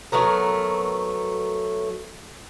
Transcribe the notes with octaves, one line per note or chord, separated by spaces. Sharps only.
F#3 A3 B3 A#4